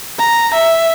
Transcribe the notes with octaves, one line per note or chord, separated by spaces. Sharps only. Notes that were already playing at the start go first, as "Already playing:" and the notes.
A#5
E5